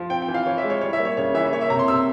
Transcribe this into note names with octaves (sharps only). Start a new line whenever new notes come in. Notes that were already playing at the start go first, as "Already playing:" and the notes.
Already playing: F3
C4 G5
G5
E3
F5
E3 C#5
E5
G#3
C#5
G3 C#5
E5
A#3
C#5
C#3 C#5
E3 E5
E5
A#3 C#5
E5
C3 A#5
C6
C3 E6